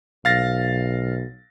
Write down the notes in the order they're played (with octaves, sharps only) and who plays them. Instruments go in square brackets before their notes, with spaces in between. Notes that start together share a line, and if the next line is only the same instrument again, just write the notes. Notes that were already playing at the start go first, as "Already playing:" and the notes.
[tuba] B1 [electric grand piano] F5 A6 A#6